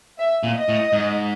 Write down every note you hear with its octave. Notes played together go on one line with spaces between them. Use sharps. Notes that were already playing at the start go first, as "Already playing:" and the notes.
E5
A#2
D#5
A2
G#2